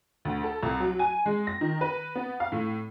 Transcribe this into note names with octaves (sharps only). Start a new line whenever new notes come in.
D2
A4
C2
F#3
G#5
G#3
A#6
D#3
B4
B3
F5
A2